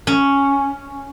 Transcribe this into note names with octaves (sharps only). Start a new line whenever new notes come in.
C#4